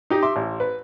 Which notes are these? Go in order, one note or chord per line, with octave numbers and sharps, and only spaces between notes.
D#4 G4 D#5
E5 C6 D6
A1
B4